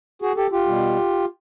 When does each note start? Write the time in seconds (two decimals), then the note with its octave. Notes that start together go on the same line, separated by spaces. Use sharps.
0.22 F#4 G#4
0.37 G4 A4
0.52 F4 G4
0.66 B2 G3